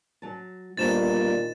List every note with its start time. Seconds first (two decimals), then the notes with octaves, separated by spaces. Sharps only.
0.22 F#3 A5
0.77 G1 D#2 A#2 C5 A5 A6 E7